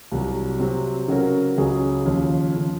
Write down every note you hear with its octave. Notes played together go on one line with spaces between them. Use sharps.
C2 C3 F#3
C3 F#3 C4
C#3 F#3 C#4 F#4 A#4
C#2 C#3 F#3 C#4 G#4
D#2 C#3 F3
C#3 F3